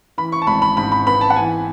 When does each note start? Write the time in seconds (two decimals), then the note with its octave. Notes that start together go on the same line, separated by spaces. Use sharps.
0.18 E3 B5
0.32 C#6
0.42 A5
0.47 G#1 B5
0.62 B5
0.77 G#2 B5
0.92 B5
1.07 B3 B5
1.21 A5
1.30 F#5
1.36 E3 G#5